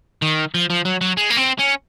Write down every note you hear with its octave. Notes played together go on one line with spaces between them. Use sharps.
D#3
F3
F3
F#3
F#3
G#3
A#3
C4
C#4